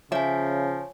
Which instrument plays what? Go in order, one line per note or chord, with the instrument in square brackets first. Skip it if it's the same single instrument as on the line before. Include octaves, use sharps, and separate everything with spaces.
[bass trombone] C#3 [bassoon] F3 [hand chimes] C#5 G#5 [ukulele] E5